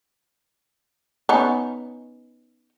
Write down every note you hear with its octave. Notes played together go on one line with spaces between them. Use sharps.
B3 C#4 D#4